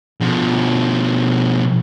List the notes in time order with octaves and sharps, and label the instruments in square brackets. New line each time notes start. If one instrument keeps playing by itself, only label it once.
[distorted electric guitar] B2 F3